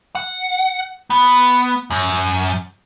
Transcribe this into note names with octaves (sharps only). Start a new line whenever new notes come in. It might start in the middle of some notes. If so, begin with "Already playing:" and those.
F#5
B3
F#2